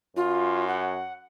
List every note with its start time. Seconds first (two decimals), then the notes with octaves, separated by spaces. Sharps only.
0.16 F#2 F4
0.68 F#5